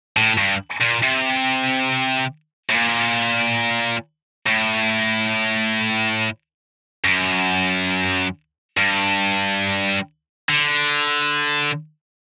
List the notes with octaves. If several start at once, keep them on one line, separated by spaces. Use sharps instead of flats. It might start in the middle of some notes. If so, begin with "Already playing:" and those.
A2
G2
A#2
C3
A2
A#2
A2
F#2
G2
D3